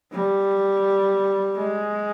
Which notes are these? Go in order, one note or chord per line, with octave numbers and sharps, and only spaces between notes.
G3
G#3